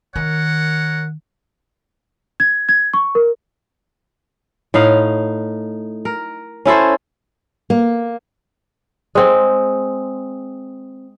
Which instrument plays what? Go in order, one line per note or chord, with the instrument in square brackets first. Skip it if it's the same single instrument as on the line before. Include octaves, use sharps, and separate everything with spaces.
[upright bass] D#3 [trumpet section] A#4 C#5 F#5
[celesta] G#6
G#6
C#6
A#4
[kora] A2 D#4 F5 F#5
A#4
C#4 E4 A4 C5
[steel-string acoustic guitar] A#3
[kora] G#3 C4